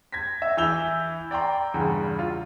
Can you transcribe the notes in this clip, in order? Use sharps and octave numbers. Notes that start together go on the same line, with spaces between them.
G#6 A#6 B6
E5
E3 E4 E6 G6 F7 G7
D5 G5 A#5 C6
E2 G2 C#3
F4